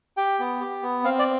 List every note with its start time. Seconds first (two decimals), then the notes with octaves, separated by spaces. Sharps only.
0.17 G4 G5
0.39 B3
0.61 G4
0.83 B3
1.04 C4 F5
1.19 D5